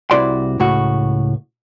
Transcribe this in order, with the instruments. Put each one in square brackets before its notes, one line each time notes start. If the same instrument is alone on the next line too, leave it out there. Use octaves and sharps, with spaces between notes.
[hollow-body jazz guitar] C2 C3 E4 F#4 D5 C6
C#2 A2 F#4